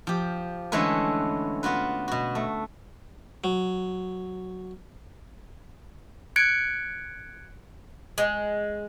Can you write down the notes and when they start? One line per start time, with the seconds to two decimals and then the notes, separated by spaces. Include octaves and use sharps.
0.07 F3 G4
0.72 D3 E3 G#3 A3 C#4 B4
1.63 B3 F4 F#4 B4
2.08 B2 F#4
2.35 A3
3.44 F#3
6.36 F#6 G#6 C#7 D7
8.18 G#3